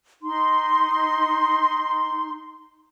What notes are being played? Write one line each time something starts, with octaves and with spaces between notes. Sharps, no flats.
D#4 C6